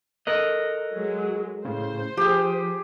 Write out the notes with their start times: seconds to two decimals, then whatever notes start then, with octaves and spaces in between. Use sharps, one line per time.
0.27 A4 A#4 D#5 F#6
0.93 F#3 G#3
1.65 A2 C#3 C5
2.17 F3 G4 G#4